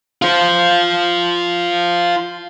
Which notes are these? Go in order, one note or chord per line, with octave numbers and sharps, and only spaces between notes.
F4 C5